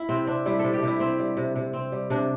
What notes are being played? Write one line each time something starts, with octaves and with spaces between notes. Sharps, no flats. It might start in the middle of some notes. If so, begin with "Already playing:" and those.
Already playing: E4
C3 C4
C4 D4
G3 E4
C3 A4
G4
C3 E4
C4
G3
C3
C3
C4
G3
C3 D4